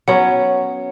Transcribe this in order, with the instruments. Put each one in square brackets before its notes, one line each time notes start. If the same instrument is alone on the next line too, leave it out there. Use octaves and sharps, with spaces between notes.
[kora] F#3 B3 C#4 [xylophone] C#5 F#5